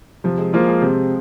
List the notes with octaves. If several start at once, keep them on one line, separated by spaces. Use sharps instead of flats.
C3 F3
G#3
F3 G#3 A#3 F4
G#3
C3 C4